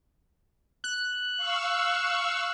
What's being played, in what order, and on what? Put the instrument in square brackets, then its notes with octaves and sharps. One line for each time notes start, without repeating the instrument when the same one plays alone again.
[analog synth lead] F#6
[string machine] F5 C#6 E6